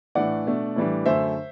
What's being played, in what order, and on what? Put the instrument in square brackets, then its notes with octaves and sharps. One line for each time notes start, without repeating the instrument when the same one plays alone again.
[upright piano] A2 E3 A3 D4 D5 F#5
B2 A3 D4
A2 E3 G3 D4
F#2 D3 A3 C5 E5